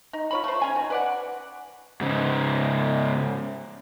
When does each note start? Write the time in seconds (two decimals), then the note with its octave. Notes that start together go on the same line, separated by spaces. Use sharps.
0.13 D#4
0.31 F4 C#5 B5
0.44 A3 C5
0.62 C#4 G#5
0.75 D#3 F#3
0.90 B4 D5 F#5
2.01 G#2 C#3